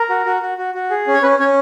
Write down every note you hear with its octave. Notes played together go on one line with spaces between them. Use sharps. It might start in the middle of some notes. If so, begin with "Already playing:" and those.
Already playing: A#4
F#4
F#4
F#4
F#4
F#4
G#4
C#4
C#5
C#4 B4
C#4 C#5